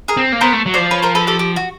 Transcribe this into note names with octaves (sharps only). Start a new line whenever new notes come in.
G#4 A#4
C4
A#3
B3 A#4 C5
A3
F#3
F3 C5 D5
B4 C#5
A#4 C5
A4 B4
G4 A4
G4
F#4